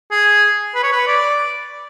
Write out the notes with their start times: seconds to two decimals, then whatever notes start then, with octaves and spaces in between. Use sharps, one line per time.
0.11 G#4
0.75 B4
0.83 C#5
0.92 B4
1.08 D5